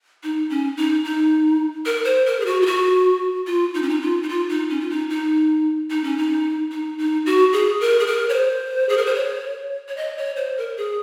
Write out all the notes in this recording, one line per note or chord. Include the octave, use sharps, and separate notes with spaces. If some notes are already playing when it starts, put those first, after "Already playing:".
D#4
C#4
D#4
D#4
A#4
C5
A#4
G#4
F#4
F4
F#4
F4
D#4
C#4
D#4
F4
D#4
F4
D#4
C#4
F4
D#4
D#4
D#4
C#4
D#4
D#4
D#4
F#4
G#4
A#4
G#4
A#4
C#5
C5
G#4
A#4
C5
C#5
C#5
D#5
C#5
C5
A#4
G#4